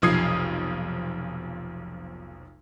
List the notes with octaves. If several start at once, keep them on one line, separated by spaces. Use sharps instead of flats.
F1 B1 F3 D#6 G#6 C7